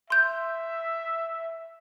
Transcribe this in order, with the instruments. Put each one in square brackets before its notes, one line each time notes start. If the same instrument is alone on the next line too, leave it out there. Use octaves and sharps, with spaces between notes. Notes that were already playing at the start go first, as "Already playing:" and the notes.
[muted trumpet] E5 [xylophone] C6 G6